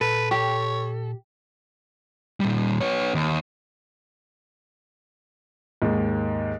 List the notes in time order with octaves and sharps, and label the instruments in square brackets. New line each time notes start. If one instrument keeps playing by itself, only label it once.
[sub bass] A#2 [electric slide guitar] A4 [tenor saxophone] B4
[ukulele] G4 [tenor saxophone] C#5
[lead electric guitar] A#2 G3
B3 C#5
D#2
[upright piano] D#2 G#2